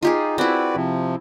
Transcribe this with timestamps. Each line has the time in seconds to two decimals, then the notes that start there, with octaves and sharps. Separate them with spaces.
0.03 D#4 F4 G4 G#4
0.38 C4 E4 F#4 B4 D5
0.76 C3 F3